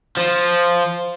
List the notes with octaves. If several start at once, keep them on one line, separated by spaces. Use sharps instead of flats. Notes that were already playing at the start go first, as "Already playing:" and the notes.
F3